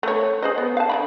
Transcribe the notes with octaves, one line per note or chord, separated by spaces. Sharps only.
A3 C#5
G#4 C5 D#5
B3
F5 A5
D3 E3 B5